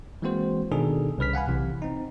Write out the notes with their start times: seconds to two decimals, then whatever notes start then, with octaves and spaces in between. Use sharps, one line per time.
0.22 E3 G#3 A#3 C4 F#4 C5
0.72 B2 D#3 D4 D#4 G#4 A4
1.18 C2 C#3 B4 F6 B6
1.33 F5 F#5 G#5 B5
1.48 B1 C3 E3
1.82 C4 D#4